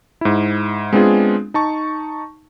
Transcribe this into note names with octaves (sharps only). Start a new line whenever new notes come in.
G#2 E4
G#3 B3 C4 D4 F4 G#4
D#4 A5 C#6